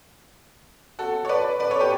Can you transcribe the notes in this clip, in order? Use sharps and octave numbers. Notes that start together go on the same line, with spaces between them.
F#4 A4
C#5
B4 D5
B4 D5
A4 C#5
G4 B4